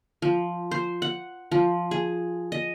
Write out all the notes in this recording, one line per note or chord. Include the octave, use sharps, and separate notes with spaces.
F3
C5
F#5
F3
G#4
D#5